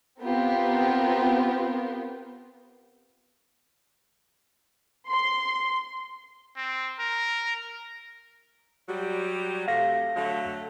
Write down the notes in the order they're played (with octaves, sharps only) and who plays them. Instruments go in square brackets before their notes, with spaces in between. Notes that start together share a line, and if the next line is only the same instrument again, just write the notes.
[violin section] B3 C4 F4 G4 A#4
C6
[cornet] C4
A#4
[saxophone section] F#3 G3
[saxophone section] C3 A3 [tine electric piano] F5 A#6
[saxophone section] D3 F#3 A3